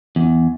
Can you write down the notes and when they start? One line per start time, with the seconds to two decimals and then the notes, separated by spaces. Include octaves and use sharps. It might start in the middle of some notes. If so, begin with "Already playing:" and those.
0.16 E2